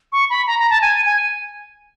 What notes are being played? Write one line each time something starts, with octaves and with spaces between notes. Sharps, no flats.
C#6
B5
A#5
A#5
A5
G#5
G#5